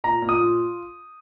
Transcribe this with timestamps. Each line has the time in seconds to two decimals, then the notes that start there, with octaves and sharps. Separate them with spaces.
0.04 A#2 A#5
0.22 A#2
0.29 D#6
0.40 F4